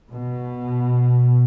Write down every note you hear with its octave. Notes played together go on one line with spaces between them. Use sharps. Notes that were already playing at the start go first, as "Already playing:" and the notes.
B2